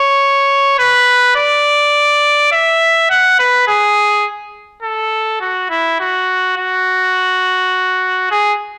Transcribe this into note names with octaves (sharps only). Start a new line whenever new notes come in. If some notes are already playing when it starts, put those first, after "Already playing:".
Already playing: C#5
B4
D5
E5
F#5
B4
G#4
A4
F#4
E4
F#4
F#4
G#4